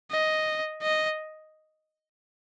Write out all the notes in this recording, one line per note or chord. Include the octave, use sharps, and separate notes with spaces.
D#5
D#5